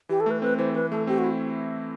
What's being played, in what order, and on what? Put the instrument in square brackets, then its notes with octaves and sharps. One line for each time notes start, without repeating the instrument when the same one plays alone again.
[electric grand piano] E3 [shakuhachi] G4
[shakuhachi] A4
[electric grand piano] A3 [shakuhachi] B4
[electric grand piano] C4 [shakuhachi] B4
[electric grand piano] E3 [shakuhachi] C5
[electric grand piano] E3 [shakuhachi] B4
[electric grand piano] A3 [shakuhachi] A4
[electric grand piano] C4 [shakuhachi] G4
[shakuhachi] F#4
[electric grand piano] E4